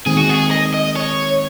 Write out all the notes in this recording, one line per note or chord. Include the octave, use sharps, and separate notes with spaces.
D#3 G#3 C4 G#4
F#4
G#4
D#5
D#5
C#5